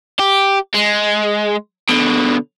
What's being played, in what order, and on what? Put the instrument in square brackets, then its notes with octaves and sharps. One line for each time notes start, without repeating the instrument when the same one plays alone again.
[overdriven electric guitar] G4
G#3
B2 D3